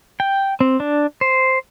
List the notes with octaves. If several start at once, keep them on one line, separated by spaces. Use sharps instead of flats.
G5
C4
D4
C5